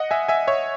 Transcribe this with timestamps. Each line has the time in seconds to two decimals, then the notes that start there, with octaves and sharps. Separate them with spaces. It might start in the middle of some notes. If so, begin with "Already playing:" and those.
Already playing: D#5 F#5
0.11 E5 G#5
0.28 E5 G#5
0.47 C#5 E5